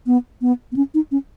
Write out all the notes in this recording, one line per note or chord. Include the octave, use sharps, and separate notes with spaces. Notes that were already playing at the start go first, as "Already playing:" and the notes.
B3
B3
B3
C#4
D#4
C#4